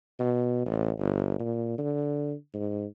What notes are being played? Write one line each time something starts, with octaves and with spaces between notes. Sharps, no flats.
B2
A1
G1
A#2
D3
G#2